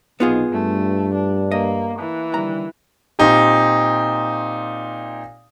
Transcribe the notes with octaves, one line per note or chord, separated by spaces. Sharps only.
B1 C3 B3 D#4 F4 G#4
G2 A3
D4
A#3 D#5
E3
D3 D#3 G3 A#5
A#2 C4 D#4 G4